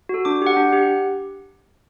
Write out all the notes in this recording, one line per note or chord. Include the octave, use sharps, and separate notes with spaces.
F#4 A4
D4 D6
G4 F#5
D4
G4